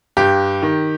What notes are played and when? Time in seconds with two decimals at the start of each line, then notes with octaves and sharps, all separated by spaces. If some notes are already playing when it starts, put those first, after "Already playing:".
0.17 G2 G4
0.62 D#3